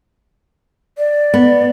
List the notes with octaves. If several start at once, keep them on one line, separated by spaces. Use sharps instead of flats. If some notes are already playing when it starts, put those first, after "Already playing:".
D5
B3